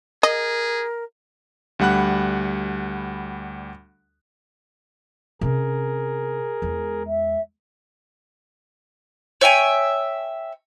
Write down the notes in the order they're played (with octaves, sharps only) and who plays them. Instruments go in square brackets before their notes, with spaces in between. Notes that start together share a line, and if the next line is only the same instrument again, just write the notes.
[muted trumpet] G#4 [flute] A#4 [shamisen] D#5
[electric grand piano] D2 G3 F#5 B5 F#6
[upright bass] C3 C#4 [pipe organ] G#4 A#4
[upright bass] E2 G#3
[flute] E5
[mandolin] C#5 E5 G5 G#5